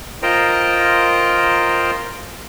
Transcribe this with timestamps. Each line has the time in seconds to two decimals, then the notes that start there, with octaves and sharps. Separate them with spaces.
0.23 F4 A#4 C5 D#5 G5 A#5